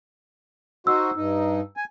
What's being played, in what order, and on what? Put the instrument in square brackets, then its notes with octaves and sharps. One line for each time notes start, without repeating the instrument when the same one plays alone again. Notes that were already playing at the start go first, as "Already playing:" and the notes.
[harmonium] D#4 F#4 C5 [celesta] E6
[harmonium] G2 D#4
G#5